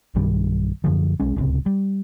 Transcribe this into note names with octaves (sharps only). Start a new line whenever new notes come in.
B1 G2 D#3 G3
F#2 D3 F3
B1 G#3 C#4
D1 C#2 C3
G3